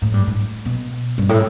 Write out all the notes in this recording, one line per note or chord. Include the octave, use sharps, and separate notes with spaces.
A2
G2
A2
B2
G2
A2